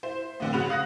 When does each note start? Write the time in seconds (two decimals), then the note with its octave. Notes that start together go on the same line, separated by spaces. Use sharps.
0.03 E4 C5
0.40 A2 D3 C4
0.53 C#3 F#4 F#5 B5 F7
0.69 F5 D#6 F#6 A#6